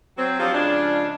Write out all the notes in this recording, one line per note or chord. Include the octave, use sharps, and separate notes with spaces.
F#3 C4
F3 F#3 C4 D4 F4 G4
C#3 F3 G#3 D4